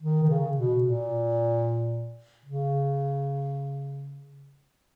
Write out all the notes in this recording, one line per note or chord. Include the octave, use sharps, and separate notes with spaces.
D#3
D#3
C#3
B2
A#2
C#3